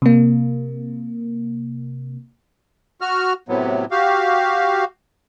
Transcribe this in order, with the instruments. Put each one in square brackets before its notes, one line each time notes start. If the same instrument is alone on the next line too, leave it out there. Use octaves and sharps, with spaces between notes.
[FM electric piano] C3 A#3
[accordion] F#4 F6
A2 C3 F#3 B3
F#4 G4 F5